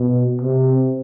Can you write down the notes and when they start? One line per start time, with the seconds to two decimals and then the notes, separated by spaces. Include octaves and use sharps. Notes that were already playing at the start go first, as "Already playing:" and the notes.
Already playing: B2
0.41 C3